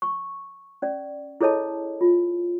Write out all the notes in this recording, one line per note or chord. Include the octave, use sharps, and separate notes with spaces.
C#6
C#4 D5
E4 G#4 A4 C#5 D#5 A5
F4